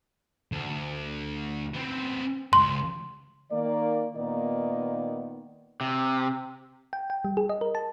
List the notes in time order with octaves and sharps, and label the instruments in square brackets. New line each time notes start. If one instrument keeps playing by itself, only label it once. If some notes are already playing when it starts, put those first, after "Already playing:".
[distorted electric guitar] D2
B3 C4
[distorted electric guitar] C#2 G#2 [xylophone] C6
[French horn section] D#3 A#3 D5
A#2 D#3 A#3 B3 D#4 D5
[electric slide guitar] C3
[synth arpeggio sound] G5
G5
G3
G#4
D#5
A#4
A5